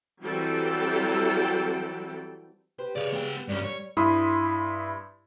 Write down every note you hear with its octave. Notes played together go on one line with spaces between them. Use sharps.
E3 F#3 G3 C4 A4 G5
G4 B4 C5
C#3 C#5 D5
B3 G5
G2 G3 C#4
C#5
G2 E4 B5 C6 D#6